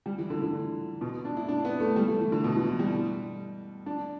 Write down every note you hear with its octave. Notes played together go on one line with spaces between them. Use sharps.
G3
E3
D3
D3
B2
D4
E4
D4
B3
A3
G3
A3
E3
D3
B2
E3
E3
G3
D4